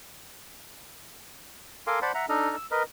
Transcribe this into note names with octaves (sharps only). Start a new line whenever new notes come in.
A4 A#4 F5 G#5 C6 D6
C5 D5 F#5 A5 B5
E5 F#5 A#5
D4 D#4 A4 D#5 F6
E6
A#4 B4 D#5